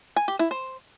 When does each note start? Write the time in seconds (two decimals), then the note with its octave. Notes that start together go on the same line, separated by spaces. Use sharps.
0.16 G#5
0.28 G4
0.39 E4
0.51 C5